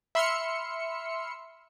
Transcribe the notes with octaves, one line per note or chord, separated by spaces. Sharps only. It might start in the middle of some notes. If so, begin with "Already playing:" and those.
E5 B5 C6 E6 F6 C#7